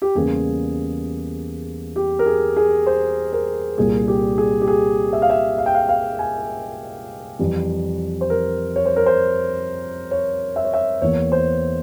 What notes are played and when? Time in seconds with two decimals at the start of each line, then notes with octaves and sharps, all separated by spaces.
0.02 G4
0.15 E2 C#3 G3 A#3 G#4
1.96 G4
2.19 A#4
2.26 G#4
2.56 G#4
2.87 C5
3.33 A#4
3.77 C2 A#2 G3 A#3 G#4
4.08 G4
4.38 G#4
4.61 G4
4.68 G#4
5.13 E5
5.22 F5
5.30 E5
5.58 F5
5.66 G5
5.75 F5
5.89 F5
6.19 G#5
7.39 F2 E3 G3
8.21 C5
8.30 A#4
8.76 C#5
8.86 C5
8.96 A#4
9.06 C5
10.11 C#5
10.56 E5
10.65 C#5
10.74 E5
11.02 E2 E3 A#3 C#5
11.32 C5